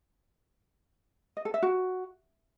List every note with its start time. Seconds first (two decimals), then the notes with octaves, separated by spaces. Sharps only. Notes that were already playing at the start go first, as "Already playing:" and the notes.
1.37 D#5
1.45 A4
1.54 E5
1.63 F#4